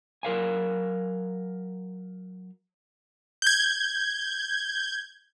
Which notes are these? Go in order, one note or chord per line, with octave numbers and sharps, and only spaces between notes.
F#3 A#4 F5 G#5
G6 G#6